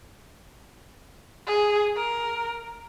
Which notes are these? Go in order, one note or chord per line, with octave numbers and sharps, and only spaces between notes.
G#4
A#4